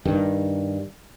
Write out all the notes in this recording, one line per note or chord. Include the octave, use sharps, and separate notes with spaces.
G2 D#3